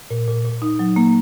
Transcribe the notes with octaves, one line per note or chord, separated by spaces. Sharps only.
A#2
A#2
A#2
D#4
F#3
A#3